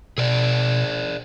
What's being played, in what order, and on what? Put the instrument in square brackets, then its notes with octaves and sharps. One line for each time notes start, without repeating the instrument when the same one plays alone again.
[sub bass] B2 [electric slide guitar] G#4 A#4 D5